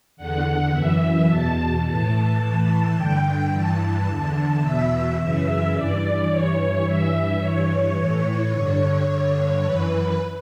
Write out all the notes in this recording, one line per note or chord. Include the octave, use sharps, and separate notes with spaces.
E2 D3 F#5
F#2 E3 E5
E2 B2 A5
A2 E3 A5
A2 E3
G2 D3 G5
G2 E3 A5
E2 D3
E2 B2 E5
F#2 C#3 E3 E5
G2 E3 D5
G2 E3 C#5
G2 E3 E5
G2 E3 C#5
A2 E3
G2 D3
G2 D3
F#2 E3 B4